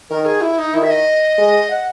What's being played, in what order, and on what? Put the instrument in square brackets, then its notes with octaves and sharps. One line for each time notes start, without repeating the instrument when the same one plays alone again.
[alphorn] D#3 [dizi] A#4
[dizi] G#4
E4
D#4
[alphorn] D#3 [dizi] E4
[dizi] E5
D#5
[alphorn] G#3
[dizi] F#5